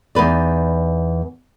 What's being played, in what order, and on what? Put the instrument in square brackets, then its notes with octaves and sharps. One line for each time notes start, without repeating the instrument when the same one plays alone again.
[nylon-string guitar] E2 D#4 B4 D5